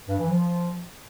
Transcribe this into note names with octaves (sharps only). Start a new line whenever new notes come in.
G2
E3
F3